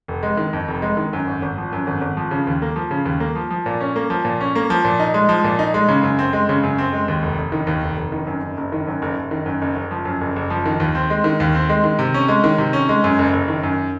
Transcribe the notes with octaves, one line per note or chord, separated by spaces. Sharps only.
F1
G#3
D#3
F2
F1
G#3
D#3
F#2
G#1
G#1
F3
F#2
G#1
G#1
F3
C#3
D#2
A#3
F3
C#3
D#2
A#3
F3
F3
A#2
C#4
A#3
F3
A#2
C#4
A#3
F3
A#2
D#4
G#3
F3
A#2
D#4
G#3
C#3
F#2
C4
G#3
C#3
F#2
C4
G#3
D#2
F1
F1
D#3
D#2
F1
F1
D#3
F#2
F#1
F#1
D#3
F#2
F#1
F#1
D#3
F#2
F#1
F#1
F3
F#2
F#1
F#1
F3
D#3
D#2
C4
G#3
D#3
D#2
C4
G#3
D#3
C3
C#4
G#3
D#3
C3
C#4
G#3
F#2
F#1
F#1
D#3
F#2